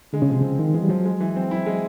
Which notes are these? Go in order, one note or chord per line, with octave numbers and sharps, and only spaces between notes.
D3 G#3
C#3
C3 F3
C#3 C4
D#3 F3
E3 G#3
G3
F3 F#3
G#3
E3
C4
E4
G#3